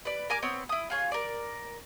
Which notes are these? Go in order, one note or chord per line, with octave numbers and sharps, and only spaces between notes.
B4 D5
A#4 G#5 D6
B3 C4 C#5
E4 D#6
F4 G#4 C#5
A#4 D5